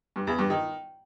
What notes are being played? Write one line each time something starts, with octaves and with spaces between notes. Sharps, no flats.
G2
E2
G2
D#3